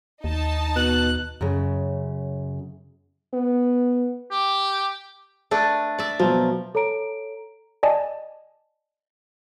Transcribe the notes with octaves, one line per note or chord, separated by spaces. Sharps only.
D#2 D#4 A5
B2 F#6
F#2 C#3
B3
G4
A3 D4 B4
D5 E5
B2 F3 F#3
A4 C#5 A#5 D7
D5 D#5 G#5 A5